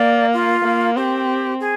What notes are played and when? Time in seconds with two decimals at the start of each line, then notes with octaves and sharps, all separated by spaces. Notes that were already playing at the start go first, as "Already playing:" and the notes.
Already playing: A#3 D5
0.33 F4
0.64 A#3
0.97 C4 G4
1.60 G#4